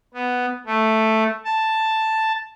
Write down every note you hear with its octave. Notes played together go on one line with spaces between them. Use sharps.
B3
A3
A5